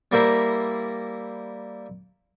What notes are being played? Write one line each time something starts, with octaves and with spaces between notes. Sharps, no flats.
G3 A#3 E4 C5 A#5